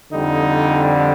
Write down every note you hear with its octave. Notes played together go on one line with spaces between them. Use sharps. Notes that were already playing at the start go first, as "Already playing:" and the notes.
F2 D3 G3 D#4